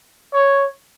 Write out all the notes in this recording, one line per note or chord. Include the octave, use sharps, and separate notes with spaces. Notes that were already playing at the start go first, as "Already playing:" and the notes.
C#5